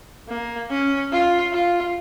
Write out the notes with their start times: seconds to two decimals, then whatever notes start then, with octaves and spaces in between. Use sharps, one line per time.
0.29 A#3
0.70 C#4
1.11 F4
1.52 F4